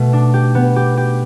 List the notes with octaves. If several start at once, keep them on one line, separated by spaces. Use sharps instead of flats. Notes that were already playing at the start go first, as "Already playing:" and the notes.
Already playing: B2 A3
D4
G4
B3
G4
G4